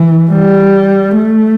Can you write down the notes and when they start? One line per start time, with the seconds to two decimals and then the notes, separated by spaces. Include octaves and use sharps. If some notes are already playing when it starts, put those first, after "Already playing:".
Already playing: E3
0.32 G3
1.16 A3